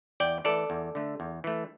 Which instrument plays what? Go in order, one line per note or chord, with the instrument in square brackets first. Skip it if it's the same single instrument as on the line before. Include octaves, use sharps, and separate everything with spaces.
[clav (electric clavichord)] E2 D5 G5
E3 A3 A4 D5
E2
D3 A3
E2
E3 A3